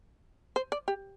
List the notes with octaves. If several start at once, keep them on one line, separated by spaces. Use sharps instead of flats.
C5
D5
G4